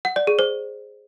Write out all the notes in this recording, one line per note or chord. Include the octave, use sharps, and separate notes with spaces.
F#5
D5
G#4
C5